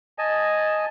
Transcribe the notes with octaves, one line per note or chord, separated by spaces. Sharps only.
D#5 G#5 A5